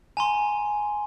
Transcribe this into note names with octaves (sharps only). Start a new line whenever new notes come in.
G#5 A#5 C6